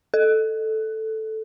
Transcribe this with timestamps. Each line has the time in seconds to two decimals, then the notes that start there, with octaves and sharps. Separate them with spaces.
0.14 A4